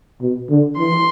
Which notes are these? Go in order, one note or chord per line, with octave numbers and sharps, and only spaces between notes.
B2
D3
E3 C6